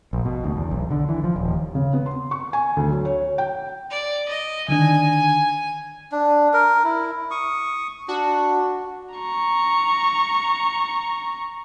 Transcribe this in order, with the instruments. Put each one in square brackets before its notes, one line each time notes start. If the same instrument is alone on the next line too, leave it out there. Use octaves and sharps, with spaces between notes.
[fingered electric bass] A#1
B2
D2
E2
B1
D3
E3
F3
D#1
D#2
[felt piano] C#3
B3
C6
C#6
G#5
D2
F#3
C#5
G5
[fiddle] D5
D#5
[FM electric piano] D3 D#3 D4 [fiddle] G#5
[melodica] D4
A#4
E4
C#6 D#6
[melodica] D4 [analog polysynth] F#4
[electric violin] A#5 C#6